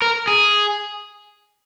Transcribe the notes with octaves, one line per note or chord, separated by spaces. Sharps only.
A#4
G#4